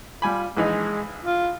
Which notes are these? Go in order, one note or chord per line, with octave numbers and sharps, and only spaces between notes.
G3 F4 G#5 B5
A#1 E3 G#3 D#4
F4